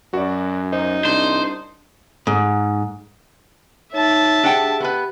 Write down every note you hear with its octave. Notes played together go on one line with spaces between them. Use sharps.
F#2 F#4 D5
D#4 C5
C2 D4 C5
G#2
D#4 C#5 E5 A5
D4 G4 G#4 F#5 G5
B3 G4 B4